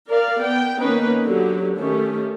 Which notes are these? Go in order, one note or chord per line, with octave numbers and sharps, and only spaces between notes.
A#4 D5 F5
B3 G5
D#3 A#3 B3 C#4 D#4 B4
D3 F#3 G4
D#3 A3 C#4 G4